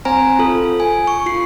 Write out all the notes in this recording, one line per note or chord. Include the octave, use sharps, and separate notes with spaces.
C4 C5 G#5 A#5
F4 A4
G#5
C#6
F4 C7